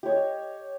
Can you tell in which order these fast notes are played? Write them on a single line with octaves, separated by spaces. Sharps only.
G4 C#5 D#5